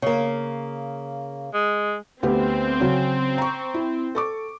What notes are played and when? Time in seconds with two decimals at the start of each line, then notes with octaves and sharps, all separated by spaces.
0.02 C#3 A#3
1.54 G#3
2.23 D2 B3 C4 G4
2.80 C#3 F#3 C#4
3.38 A#5 C#6
3.74 E4
4.15 A4 C#6 D6